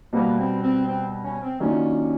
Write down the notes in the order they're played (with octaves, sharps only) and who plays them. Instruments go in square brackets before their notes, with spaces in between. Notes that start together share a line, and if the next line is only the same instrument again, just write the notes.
[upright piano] B2 G3 B3 [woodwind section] A#3
[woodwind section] C4
C4
C4
C#4
C4
[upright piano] D#3 F#3 A#3 D4 F4 [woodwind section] C#4